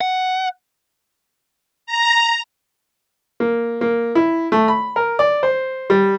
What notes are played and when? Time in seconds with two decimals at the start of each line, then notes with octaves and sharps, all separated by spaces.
0.01 F#5
1.87 A#5
3.40 A#3
3.81 A#3
4.15 E4
4.52 A3
4.68 B5
4.96 A#4
5.19 D5
5.43 C5
5.90 G3